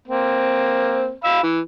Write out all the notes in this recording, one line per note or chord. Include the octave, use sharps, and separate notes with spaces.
A#3 C4
F5 B5 E6
E3